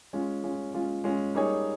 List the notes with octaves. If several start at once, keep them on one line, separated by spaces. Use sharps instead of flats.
G#3 C#4 F4
G#3 C#4 F4
G#3 C#4 F4
G#3 C#4 F4
G3 A#3 D#4 G#4 C#5